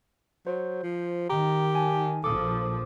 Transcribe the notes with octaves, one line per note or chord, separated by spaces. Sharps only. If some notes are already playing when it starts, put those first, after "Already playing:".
F#3 C5
F3
D#3 G4 A#5
G#5 A5
A#1 F3 A4 D6 D#6